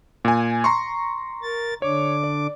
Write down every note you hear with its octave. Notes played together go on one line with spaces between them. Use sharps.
A#2 G#5
A#5 C6 C#6
A#4 A6
D3 D4 C#5 D6
D5